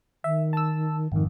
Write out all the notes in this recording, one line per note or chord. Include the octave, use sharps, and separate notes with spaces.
D#3 E5
A5 E6
G#1 F2 D#3